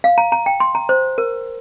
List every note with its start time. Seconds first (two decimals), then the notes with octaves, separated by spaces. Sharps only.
0.04 F5
0.18 A#5
0.32 A#5
0.46 G5
0.60 C6
0.75 A#5
0.89 C5
1.18 A#4